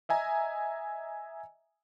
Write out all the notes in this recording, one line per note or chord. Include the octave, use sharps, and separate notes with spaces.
D#5 E5 G#5 A#5